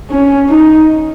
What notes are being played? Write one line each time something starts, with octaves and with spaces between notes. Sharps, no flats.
C#4
D#4